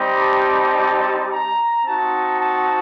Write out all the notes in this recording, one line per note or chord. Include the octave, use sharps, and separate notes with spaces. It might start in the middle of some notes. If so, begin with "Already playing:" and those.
Already playing: G3 C4 D#4 G4
A5
A#5
C4 D#4 F#4 A5
A5